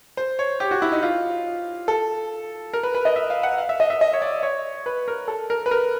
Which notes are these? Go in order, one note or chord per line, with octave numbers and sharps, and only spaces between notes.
C5
C#5
G4
F#4
E4
D#4
F4
A4
A#4
B4
B4
D#5
E5
F5
F#5
F5
E5
D#5
E5
D#5
C#5
D5
C#5
B4
A#4
A4
A#4
B4
A#4